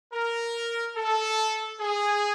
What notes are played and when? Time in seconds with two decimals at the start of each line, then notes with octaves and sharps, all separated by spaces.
0.12 A#4
0.95 A4
1.79 G#4